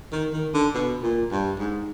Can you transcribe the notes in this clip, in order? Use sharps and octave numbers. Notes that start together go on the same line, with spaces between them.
D#3
D#3
D3
B2
A#2
G2
G#2